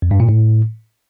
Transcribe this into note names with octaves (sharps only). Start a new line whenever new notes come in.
F2
G2
A#2
A2